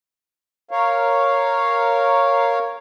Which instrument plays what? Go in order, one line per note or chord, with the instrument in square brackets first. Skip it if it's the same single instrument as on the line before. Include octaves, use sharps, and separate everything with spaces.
[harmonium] A#4 C#5 F5